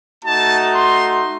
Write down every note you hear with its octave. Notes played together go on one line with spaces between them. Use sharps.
A3 D#4 F#4 A5
C6